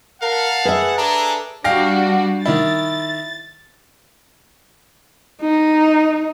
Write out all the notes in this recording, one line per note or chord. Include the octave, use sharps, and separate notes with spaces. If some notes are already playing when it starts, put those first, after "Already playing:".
A#4 F5 F#5 A5
G#4 B4 E5
D4 G#4 A4 A#5
G3 D4 F#4 F5 G5 A#6
D#3 E4 A6
D#4